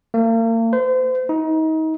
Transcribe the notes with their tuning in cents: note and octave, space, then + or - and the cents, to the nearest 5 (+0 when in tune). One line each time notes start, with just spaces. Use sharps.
A#3 -40
C5 -35
D#4 +30